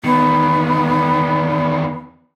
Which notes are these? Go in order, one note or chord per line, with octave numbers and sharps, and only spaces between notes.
E2 D#3 B3